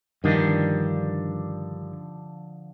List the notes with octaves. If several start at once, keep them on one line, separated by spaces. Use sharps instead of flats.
G2 D3 D#3 F3 D4